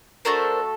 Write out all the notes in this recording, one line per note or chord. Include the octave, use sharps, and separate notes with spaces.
A3 D4 F#4 A4 A#4 C5